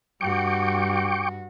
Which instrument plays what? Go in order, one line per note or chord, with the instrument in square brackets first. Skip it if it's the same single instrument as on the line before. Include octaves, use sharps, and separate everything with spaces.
[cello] G2 F#4 [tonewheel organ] G5 C#6 D6